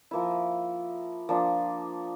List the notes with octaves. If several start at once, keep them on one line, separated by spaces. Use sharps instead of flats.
F3 A#3 E4
F3 A#3 D4